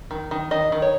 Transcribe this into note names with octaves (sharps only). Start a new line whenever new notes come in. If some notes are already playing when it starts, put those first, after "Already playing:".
D#3
D#3
D#3 D#5
D#3
C#5